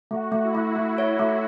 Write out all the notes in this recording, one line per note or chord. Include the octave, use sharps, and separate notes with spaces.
A3 F#4
A3
E4
A3
A3 F#4
C#5
E4
A3